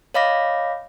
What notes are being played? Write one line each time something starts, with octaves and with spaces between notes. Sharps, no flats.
C#5 D#5 F5 B5 D6 A#6